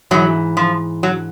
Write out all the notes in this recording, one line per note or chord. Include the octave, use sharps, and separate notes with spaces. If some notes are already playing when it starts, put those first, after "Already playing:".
G#2 E3 F#3
F3
F#3